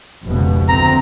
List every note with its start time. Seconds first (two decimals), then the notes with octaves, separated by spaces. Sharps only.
0.25 F1 C#2 B2
0.69 D2 C4 A#5